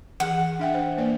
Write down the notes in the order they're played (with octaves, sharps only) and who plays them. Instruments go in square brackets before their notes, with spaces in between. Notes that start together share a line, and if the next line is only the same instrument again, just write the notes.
[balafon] E3 G#4 [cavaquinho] F#5
[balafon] D4 E5 G5
C5
A#3 B4 D5